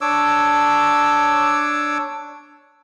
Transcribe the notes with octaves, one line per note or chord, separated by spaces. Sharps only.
D4 C#5 D6 E6